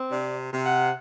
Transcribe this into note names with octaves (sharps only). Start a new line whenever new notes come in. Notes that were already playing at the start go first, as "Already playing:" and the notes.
Already playing: C4
C3 D5
C3
F#5